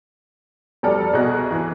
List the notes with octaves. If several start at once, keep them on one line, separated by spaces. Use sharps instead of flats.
F1 G3 A4 D5 F6
C2 B2 G#4 D#5 F#6
E3